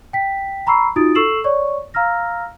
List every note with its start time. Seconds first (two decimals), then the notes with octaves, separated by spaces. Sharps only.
0.13 G5 B6
0.67 A#5 B5 C#6 E6 C7
0.96 D#4 F4 F#4 D#6 A6 D7
1.15 A4 C#6 E6 C7 E7 F#7
1.44 C#5 D5 C#6
1.94 F5 A#5 E6 F6 A#6